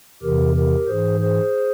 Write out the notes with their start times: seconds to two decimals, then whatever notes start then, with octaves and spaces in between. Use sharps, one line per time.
0.23 E2 C3 E3 G4 A#4
0.56 G4 A#4
0.87 G#2 E3 G#4 C5
1.20 G#4 C5